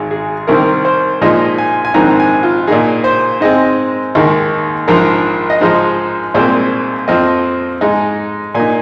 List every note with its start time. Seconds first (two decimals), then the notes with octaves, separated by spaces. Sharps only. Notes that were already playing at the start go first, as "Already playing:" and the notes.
Already playing: G#1 G#2 G#3
0.11 G#4
0.47 C2 C3 D#3 C4 A#4
0.85 C5
1.22 A#2 F3 G#3 D#4 D#5
1.58 G#5
1.85 G#5
1.94 A#1 G#2 D#3 C4 A#5
2.20 G#5
2.43 F4
2.67 A#2 A#3 D#4 G#4
3.04 C5
3.41 G#2 G#3 C4 D#5
4.15 D#2 D#3 G#3 D#4
4.88 A#1 G#2 F3 A#4
5.50 D#5
5.61 G#2 F3 G#3 D#4 C5
6.34 C2 A#2 G#3 C4 C5
7.08 F2 F3 C4 D#5
7.81 G#2 G#3 D#4 D#5
8.55 A#2 A#3 D#4 G#5